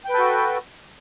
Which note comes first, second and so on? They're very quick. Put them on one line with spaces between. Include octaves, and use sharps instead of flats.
G5 B4 A4 F#4